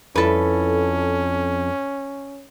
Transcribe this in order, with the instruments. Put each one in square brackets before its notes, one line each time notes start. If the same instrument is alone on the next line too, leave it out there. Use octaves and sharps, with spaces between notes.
[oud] F2 E4 [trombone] C#4 [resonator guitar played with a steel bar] A4 B4